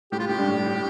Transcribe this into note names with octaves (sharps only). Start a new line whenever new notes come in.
A2 G4
F4
A2 G4
G2
A2
A2